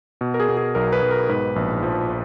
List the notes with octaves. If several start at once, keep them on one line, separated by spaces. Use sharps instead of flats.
B2
A#4
G#4
B2
G#4
B1 A#4
B4
B1
A#4
G#2 B4
A#1
F3